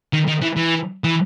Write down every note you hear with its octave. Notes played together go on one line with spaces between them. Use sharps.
D#3
D#3
E3
E3
E3